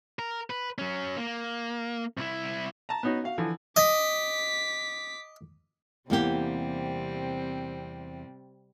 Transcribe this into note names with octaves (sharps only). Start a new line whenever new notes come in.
A#4
B4
F#3 C#4
A#3
C2 E4
A5 A#5
B3 C#4 D#4 F#4
F#4 F5
D3 E3 F3
D#5 D6 B6
E2 C3 G3 A#3 C4 G4